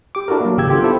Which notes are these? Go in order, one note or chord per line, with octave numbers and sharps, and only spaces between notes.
G4 D6
D4 E4 F#4 A4 A#4
F#3 A#3
G#1 C#3 G4 E6 G#6
B3 D4 F4 G4 A4
E4 A4 C5